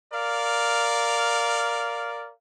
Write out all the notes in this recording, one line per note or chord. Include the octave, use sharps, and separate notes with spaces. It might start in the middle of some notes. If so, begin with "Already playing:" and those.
A#4 D5 F5